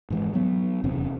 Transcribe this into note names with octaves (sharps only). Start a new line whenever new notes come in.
G#2 E3 G#3
F#3 B3
D#1 E2 C3 C#4